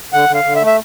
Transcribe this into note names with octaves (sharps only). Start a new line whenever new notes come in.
D3 F#5
D3
F5
D3
E5
A3
E5